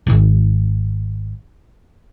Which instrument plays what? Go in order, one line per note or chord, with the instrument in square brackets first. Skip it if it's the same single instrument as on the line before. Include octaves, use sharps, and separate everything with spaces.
[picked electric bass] D1 G#1